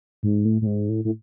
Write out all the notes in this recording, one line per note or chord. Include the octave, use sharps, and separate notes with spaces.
G#2
A2
A2
G#2
A2
A2